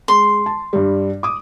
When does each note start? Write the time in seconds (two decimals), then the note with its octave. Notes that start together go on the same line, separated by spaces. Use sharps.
0.08 G#3 C6
0.46 A5
0.73 G2 G3
1.23 D6 D#6